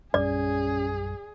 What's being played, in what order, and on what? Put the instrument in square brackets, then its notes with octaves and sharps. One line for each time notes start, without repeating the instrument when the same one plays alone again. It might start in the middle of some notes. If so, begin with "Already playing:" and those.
[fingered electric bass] A#1 F#2 G3 [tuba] C#4 [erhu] G#4 [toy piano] D5